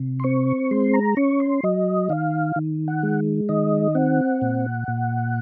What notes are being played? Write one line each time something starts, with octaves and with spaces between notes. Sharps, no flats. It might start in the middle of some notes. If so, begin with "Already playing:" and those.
Already playing: C3
C6
C4 C#6
G#3 C6
A#5
C#4 C#6
C6
F#3 D#5
D#3 F5
D#3
F#5
G#3
D#3 D#5
C4 F#5
A#2
A#2